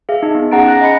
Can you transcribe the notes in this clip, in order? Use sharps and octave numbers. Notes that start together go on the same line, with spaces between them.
G#4 E5 F5
D#4
B3 D#4 F5
C#4 G#4 F#5 A#5 A6 D7
F#5 F#6 A#6
D#5 G#5 B5 C#7